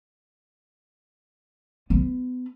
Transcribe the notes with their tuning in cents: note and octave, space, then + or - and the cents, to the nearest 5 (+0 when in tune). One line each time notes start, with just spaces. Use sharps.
B3 +30